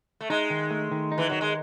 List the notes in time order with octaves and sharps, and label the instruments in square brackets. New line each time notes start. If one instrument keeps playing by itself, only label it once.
[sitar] A3
[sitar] G#3 [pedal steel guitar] D#4
[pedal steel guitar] D#3
A3
D#3
D#4
[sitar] E3
[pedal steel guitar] D#3 [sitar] F#3
[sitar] G#3